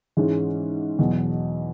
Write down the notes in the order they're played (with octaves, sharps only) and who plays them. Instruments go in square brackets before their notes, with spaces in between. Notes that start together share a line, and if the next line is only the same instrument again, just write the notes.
[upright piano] G#2 E3 G#3 C#4
E2 B2 F#3